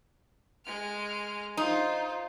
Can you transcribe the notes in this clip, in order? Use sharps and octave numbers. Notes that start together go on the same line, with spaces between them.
G#3 F6
D#4 F4 C5